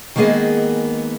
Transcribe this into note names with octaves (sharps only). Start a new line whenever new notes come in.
D#3 G#3 A#3 B3 G#4 D#5